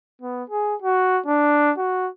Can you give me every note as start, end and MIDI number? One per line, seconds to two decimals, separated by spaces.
0.21 0.43 59
0.50 0.75 68
0.82 1.19 66
1.26 1.72 62
1.78 2.08 66